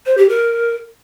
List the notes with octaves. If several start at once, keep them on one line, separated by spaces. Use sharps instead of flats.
C5
G4
A#4